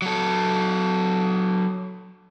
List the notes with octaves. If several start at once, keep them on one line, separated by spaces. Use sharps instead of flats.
F#3 A4